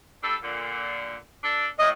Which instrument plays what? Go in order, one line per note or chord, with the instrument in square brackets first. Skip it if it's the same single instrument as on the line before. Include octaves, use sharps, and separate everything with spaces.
[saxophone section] G3 D4 A4
A#2 D3
D4 A4
[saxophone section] A2 [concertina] D#5